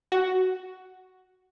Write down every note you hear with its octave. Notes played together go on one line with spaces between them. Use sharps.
F#4